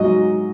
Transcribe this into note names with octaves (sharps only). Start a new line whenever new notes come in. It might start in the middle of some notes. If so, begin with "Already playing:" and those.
Already playing: G#2 F#3 D#5